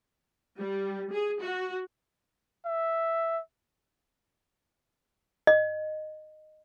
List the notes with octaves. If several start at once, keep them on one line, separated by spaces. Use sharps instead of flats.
G3
G#4
F#4
E5
D#5